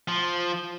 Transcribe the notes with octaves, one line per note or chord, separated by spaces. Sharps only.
F3